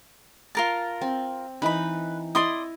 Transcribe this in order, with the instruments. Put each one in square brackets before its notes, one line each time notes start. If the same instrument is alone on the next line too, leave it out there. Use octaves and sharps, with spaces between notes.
[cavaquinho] F4 A#4 A5
[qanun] C4
[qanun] E3 D#4 [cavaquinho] B4 B5
[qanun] E4 D#5 [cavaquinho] D5 C6 D#6